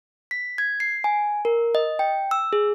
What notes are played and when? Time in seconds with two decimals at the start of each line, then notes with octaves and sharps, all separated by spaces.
0.31 B6
0.58 G#6
0.80 C7
1.04 G#5
1.45 A#4
1.75 D#5
1.99 G5
2.31 E6
2.53 G#4